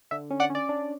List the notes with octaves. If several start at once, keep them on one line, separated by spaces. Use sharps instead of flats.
D3 E5
C#4
D5 F#5
C#4
D5
D4